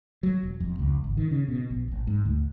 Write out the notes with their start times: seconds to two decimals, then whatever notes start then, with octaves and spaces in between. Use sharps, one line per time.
0.23 F#3
0.43 E1
0.60 F2
0.79 C#2
1.04 G#1
1.17 D#3
1.31 C#3
1.48 B2
1.70 A#1
1.91 A1
2.07 G#2
2.25 D2